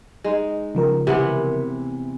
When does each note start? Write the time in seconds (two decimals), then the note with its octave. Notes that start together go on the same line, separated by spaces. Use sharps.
0.24 G#3 D#4
0.75 C#3 F3 A#4
1.07 C3 E3 B3